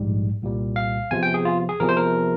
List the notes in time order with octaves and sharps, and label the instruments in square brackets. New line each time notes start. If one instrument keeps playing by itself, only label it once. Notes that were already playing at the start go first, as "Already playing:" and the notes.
Already playing: [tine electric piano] A#1 G#2 G3
C2 A#2 G3
F5
E2 C3 F3 G#5
G5
G#4
F4
G#4
E2 C3 F3 A#4
C5
A#4